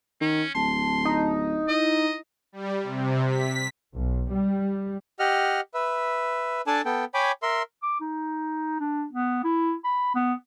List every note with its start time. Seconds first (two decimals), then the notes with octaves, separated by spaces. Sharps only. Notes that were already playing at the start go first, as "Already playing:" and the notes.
0.21 D#3 C#4
0.55 D1 A5 C6
1.05 D#4
1.68 E4 D#5
2.52 G3
2.83 C3
3.27 B6
3.94 B1
4.31 G3
5.19 G4 D#5 F#5 F6
5.74 B4 E5
6.67 D4 A4 D5 G#5 A5
6.85 B3 A4 G5
7.14 C#5 G5 G#5 B5 D6
7.42 A#4 E5 C6
7.83 D6
8.00 D#4
8.80 D4
9.13 B3
9.44 E4
9.85 B5
10.15 B3